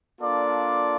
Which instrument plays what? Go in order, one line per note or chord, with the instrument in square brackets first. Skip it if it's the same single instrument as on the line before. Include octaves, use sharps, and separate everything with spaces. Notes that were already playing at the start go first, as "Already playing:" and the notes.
[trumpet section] A#3 D4 F4 A4 D5